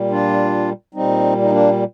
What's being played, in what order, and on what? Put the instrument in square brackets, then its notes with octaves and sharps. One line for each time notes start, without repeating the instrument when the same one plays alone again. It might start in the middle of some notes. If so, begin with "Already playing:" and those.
Already playing: [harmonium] A#2 G3
D4 F4
A#2 G3 C4 D#4
D#4
A#3 D4